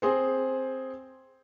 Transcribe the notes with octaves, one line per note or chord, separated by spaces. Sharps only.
C4 G#4 C5